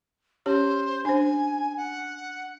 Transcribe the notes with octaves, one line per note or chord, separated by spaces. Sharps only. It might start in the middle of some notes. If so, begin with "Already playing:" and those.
C#4 G4 C5 C#5
D4 C5 G#5
F#5